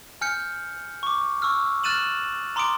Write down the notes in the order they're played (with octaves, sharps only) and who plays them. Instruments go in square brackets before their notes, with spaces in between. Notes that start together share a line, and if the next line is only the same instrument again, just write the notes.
[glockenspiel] G#5 F6 G6 C#7
C#6 D6
C#6 E6 F6
F6 F#6 A6 D#7 E7 F#7
A#5 C6 D6 D#6 D7